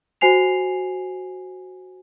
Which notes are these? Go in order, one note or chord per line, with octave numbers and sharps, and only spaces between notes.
F#4 C5 G#5 C7 F7